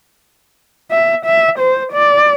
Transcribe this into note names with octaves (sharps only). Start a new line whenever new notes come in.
E5
E5
C5
D5